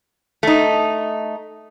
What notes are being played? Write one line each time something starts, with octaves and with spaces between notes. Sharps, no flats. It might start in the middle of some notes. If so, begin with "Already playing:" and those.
A3 D#4